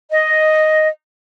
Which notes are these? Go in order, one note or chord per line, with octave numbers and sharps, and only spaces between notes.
D#5